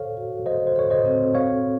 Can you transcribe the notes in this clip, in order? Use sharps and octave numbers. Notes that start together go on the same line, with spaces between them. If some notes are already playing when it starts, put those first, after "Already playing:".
Already playing: A4 C5 C#5 F5
F#4
A4 C5 D#5
C5
A4 C#5
C5 D#5
C4
C5 C#5 F5